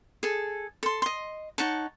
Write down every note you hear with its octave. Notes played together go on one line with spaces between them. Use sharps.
G#4 A4
A4 C6
D#5 C6
D#4 C#5 F#5 A5